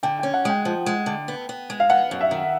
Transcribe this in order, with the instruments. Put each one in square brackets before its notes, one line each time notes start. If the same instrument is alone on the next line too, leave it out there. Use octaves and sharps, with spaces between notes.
[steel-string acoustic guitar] D3 [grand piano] G5
[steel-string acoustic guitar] C#4 [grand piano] G5
[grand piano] F#5
[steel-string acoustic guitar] G#3 [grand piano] G5
[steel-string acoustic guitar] F3
G#3
D3
B3
B3
G#3
[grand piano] F5
[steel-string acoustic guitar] B3 [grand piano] F#5
[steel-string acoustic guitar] F#2
[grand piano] E5
[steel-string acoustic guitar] D#3